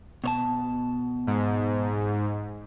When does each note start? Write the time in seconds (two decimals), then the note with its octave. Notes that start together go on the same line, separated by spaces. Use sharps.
0.24 B2 C#5 A5
1.27 G#2